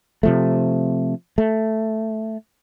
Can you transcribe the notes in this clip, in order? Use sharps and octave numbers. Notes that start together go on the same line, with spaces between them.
C3 F3 A3
A3